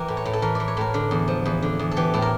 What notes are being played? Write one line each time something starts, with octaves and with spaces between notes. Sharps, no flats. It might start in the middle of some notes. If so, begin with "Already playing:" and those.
Already playing: E3 G4 A#4
A2
C#5
A2
A4
E3 A#4
E3 D5
C#5
A2 A#4
D3
E2
F3
E2
D3
E2
A4
E3 G4
A2 A4
A#4